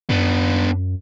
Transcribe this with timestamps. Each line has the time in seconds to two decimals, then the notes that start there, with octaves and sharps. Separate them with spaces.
0.09 F#2 B3 D4